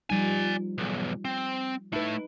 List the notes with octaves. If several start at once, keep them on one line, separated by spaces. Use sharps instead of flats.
F3 G3 D#4 D5 G#5
B1 E2
C4
A3 D#4 E4 B4